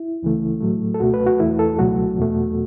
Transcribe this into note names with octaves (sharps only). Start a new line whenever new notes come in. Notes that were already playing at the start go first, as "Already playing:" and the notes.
Already playing: E4
C#2 C#3 E3 A3
A2 F#3 A3
A4
C#2 B2 A3 F#4
B4
F#4
E2 E3 A3 E4
A4
C#2 B2 F#3 A3 F#4
E2 B2 A3